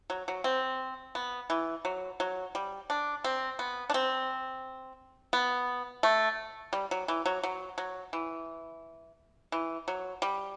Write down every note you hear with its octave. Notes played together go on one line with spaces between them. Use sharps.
F#3
F#3
C4
B3
E3
F#3
F#3
G3
D4
C4
B3
D4
C4
B3
A3
G3
F#3
E3
F#3
F#3
F#3
E3
E3
F#3
G3